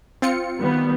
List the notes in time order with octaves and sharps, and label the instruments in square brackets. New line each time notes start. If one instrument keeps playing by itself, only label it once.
[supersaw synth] C4 F4 C#7
[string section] D#3 G3 B3